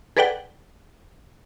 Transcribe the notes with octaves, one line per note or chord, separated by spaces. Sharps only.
G#4 A4 B4 D5 F#5 G5